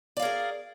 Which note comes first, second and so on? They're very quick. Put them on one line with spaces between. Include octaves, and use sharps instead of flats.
D5 F5 A#4 G#4